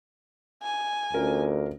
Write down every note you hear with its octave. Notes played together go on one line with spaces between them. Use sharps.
G#5
D2 C#4 F4 A#4